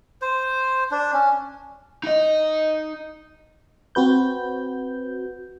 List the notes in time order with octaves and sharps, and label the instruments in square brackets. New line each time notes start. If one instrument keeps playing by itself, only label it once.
[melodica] C5
D4
C#4
[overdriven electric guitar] D#4 D#5
[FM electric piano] C4 F#4 B4 G6